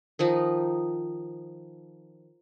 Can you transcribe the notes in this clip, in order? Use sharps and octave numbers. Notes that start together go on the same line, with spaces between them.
D#3 F3 D#4